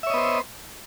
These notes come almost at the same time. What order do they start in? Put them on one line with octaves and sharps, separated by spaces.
E5 C#5 D#5 B3 C5